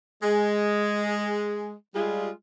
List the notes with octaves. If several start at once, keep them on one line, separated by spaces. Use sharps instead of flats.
G#3
G3 G#3 F4